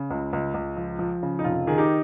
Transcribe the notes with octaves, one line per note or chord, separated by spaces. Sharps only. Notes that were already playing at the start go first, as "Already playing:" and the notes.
Already playing: C#3
C#2
C#2
C#2
F3
F3
C#3
D#4
F1 F4
D#3 G#4
D#4 G4